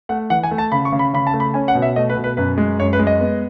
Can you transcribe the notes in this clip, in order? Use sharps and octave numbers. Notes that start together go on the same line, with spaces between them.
A3 F#5
E3 F#5
G#5
A3
A5
C#3 B5
C#6
C#3
B5
C#3 B5
A5
A3
B5
C#4 G#5
F#5
B2
E5
A3 D#5
B4
B2
B4
F#2 B4
G#3
F#2 C#5
B4
G#3
D#5
B3